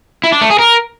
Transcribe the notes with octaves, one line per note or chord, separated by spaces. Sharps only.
E4
D4
A3
G#4
A#4